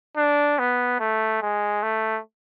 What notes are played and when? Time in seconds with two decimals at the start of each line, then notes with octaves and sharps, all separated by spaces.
0.17 D4
0.59 B3
1.00 A3
1.42 G#3
1.83 A3